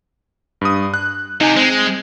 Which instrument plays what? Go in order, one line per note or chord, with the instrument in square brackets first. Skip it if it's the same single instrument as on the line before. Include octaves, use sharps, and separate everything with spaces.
[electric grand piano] G2 D#6
F#6
[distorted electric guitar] C3 [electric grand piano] D#4 G#5
[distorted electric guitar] G#3 [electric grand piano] C4